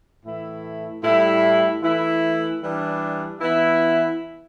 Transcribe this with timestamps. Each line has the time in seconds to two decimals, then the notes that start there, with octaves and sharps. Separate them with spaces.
0.24 A2 E3 A3 E4
1.03 A2 G3 E4
1.82 E3 A3 E4
2.61 E3 G3 D4
3.40 E3 B3 E4